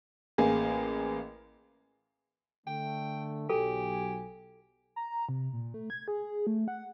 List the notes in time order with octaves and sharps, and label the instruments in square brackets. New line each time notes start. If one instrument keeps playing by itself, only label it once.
[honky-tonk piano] A1 A#3 G#4
[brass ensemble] D3 A3 [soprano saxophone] G5
[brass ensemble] B1 F#3 G#5 [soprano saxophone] G4 [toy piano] A4
[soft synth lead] A#5
C3
A#2
A3
G#6
G#4
A3
F#5